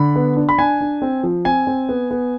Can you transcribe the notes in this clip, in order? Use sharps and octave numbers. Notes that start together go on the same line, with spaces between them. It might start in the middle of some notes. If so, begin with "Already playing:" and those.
Already playing: D3 B5
B3
D4
B5
D4 G#5
D4
C4
F3
C4 G#5
C4
B3
B3